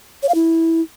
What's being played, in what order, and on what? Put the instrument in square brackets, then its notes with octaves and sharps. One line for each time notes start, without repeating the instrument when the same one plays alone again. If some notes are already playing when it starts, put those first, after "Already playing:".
[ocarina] C#5
F5
E4